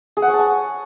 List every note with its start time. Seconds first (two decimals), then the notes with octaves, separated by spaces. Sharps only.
0.17 G#4
0.22 F#5
0.28 C#5
0.33 A5
0.39 G#5